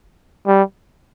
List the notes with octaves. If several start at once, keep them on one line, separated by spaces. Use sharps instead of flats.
G3